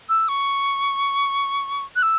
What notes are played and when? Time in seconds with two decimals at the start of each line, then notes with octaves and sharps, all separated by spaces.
0.09 E6
0.28 C#6
1.96 F#6
2.02 E6